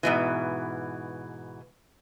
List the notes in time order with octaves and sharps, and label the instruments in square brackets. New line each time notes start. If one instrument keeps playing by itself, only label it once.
[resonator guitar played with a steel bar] G#2 B2 E3